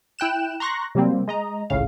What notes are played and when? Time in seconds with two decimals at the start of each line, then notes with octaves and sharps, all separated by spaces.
0.19 E4 G5 F#6 E7
0.60 A#5 C6 C#6 F#6 A#6
0.95 C3 F#3 G3 A#3 C4
1.28 G#3 D#5 A#5
1.70 G#1 C#2 A2 C#3 F5